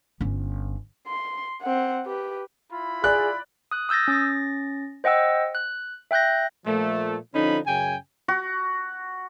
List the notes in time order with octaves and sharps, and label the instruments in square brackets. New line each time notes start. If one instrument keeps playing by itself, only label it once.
[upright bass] G1 C#4
[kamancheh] C6
C4 F#5
G4 B4
[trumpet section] E4 F4 B5
[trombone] G#4 [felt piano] D5 [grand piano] F#6
[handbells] D#6 F#6
D#6 E6 G6 A6 A#6
C#4 A6 A#6
C5 D#5 F#5 G5 E6
F#6
E5 G5 F#6 G6 A#6
[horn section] A#2 F3 A3
D3 F3 C#4 D#4 B5
F#2 C#3 G5 G#5
[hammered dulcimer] F#4